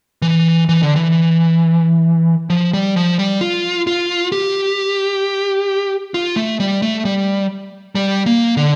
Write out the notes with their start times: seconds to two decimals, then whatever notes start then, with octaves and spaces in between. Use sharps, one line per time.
0.22 E3
0.69 E3
0.83 D3
0.96 E3
2.50 F3
2.73 G3
2.96 F3
3.19 G3
3.41 F4
3.87 F4
4.32 G4
6.14 F4
6.36 A3
6.60 G3
6.82 A3
7.05 G3
7.95 G3
8.26 A#3
8.57 D3